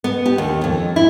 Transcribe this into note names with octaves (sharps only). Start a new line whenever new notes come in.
B3
G4
D#2
F2
E4